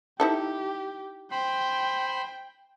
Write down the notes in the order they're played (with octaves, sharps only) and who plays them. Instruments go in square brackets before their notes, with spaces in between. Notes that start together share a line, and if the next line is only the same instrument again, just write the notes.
[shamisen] D#4 E4 A4 [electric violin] G4
[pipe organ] C5 B5 C6 [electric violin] G5